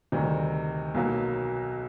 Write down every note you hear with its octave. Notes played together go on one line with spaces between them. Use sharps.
D2 C3 D#3 G3
B1 B2 F#3 A#3